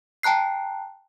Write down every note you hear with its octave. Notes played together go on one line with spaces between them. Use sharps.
G5 A5 A#5 F#6 C7